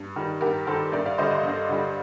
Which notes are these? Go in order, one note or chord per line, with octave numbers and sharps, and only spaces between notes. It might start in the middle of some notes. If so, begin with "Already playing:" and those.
Already playing: G2
D#3 G3
G2 G4 A#4
D#3 G3 A4 C5
G2 A#4 D5
D5 F5
D3 G3 C5 D#5
C5 D#5
G2
D3 G3